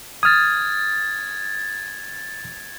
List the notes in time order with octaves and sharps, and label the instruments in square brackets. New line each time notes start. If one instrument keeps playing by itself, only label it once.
[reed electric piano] D#6 F6 [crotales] G#6 A6